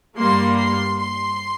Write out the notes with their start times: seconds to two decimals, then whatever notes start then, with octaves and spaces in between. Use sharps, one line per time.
0.19 G2 G3 A#3 C6
0.58 C6
0.99 C6